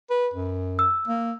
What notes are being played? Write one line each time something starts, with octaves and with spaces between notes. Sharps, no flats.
B4
F#2
E6
A#3